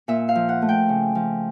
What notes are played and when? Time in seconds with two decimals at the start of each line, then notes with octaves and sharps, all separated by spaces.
0.08 A#2 E5
0.29 F5
0.35 F3
0.49 F#5
0.62 A3
0.69 G5
0.89 C#3
1.15 F3